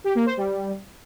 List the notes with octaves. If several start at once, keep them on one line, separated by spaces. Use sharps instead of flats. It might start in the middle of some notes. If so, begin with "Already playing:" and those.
G4
A#3
C5
G3